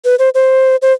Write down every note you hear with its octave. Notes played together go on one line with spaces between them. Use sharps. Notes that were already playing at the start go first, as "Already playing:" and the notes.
B4
C5
C5
C5